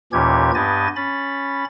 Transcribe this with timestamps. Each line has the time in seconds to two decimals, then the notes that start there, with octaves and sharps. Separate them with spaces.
0.13 D#2 A#2 E3 C#4 G4 G#6
0.55 G2 B3 G4 D#5 G#5 A6
0.96 C#4 B5 A6